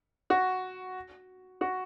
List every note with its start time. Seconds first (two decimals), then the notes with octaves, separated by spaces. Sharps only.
0.30 F#4
1.61 F#4